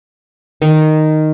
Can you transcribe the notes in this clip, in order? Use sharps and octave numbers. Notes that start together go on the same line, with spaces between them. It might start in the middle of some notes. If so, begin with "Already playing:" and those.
D#3